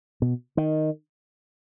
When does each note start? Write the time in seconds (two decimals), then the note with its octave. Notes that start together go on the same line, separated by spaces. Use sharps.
0.22 B2
0.57 D#3